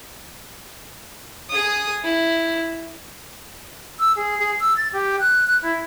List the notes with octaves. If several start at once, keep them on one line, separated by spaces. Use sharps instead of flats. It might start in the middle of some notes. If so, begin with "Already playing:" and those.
G#4 D#6
E4
E6
G#4
G#4
E6
A6
G4
F#6
F#6
E4